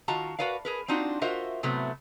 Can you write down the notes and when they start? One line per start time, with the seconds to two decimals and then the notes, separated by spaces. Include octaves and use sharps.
0.08 D#3 F4 F#4 A5 A#5
0.39 F#4 A#4 B4 D5 F5
0.65 G#4 A#4 B4
0.88 C4 D4 D#4 F4 F#4
1.21 F4 F#4 A#4 C5 D#5 E5
1.63 A2 C3 F#3 A3 B3